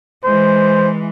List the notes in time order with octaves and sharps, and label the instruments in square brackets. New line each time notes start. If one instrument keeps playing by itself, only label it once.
[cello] E3 G#3 [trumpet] C5